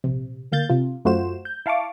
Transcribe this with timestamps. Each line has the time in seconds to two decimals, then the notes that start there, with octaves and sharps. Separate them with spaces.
0.04 A#1 C3
0.52 D2 A#3 F5 G6 A6
0.69 C3 F4
1.05 F#2 A3 F4 F#4 C5 E7
1.45 G6
1.66 E4 F5 A5 C#6 D6